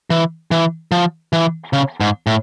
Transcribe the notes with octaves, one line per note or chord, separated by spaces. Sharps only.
E3
E3
F3
E3
C#3
G#2
A2